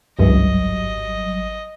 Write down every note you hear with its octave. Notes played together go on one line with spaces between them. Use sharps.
G#1 C#2 G2 E3 F#3 G3 D#5